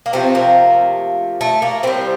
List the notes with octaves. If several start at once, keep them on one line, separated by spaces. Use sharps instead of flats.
A#3
C3 F3 A3 C4
A#3
A3
A#3
A2 G3 C4